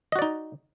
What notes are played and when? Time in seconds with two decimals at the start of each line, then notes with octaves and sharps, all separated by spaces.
0.12 D#5
0.16 F#4
0.19 D5
0.22 D#4